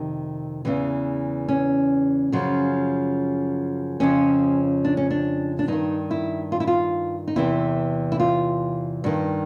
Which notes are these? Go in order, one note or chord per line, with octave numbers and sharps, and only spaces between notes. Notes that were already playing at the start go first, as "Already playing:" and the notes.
Already playing: F2 C3 D#3
E2 C#3 E3
C#4
F#2 C#3 F3
F2 C#3 F3 C#4
D4
C#4
D4
D4
G2 D#3 D#4
E4
F4
E4
F4
D#4
E2 C3 E3 E4
E4
F4
G2 D#3